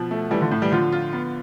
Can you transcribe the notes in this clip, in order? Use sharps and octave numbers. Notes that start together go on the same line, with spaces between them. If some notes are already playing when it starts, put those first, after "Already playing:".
Already playing: B2 F3
A3
E3 G3 A3
D3 F3
A2
E3 G3
D3 F3 F4
F4
B3